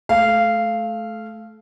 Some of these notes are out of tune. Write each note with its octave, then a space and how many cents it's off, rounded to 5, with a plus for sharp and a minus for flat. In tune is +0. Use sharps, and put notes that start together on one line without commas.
A3 -25 F5 -15